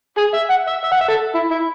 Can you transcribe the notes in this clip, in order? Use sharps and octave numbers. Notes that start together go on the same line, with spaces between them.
G#4
E5
F#5
E5
E5
F#5
E5
A4
E4
E4